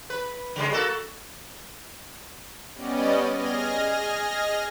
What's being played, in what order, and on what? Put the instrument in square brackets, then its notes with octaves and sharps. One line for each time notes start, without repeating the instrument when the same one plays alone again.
[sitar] B4
C#3 G3 G#3
A#3 F#4 A4
[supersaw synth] G3 B3 C#4 D5 D#5
G#4 D#5 G#5 F6 A#6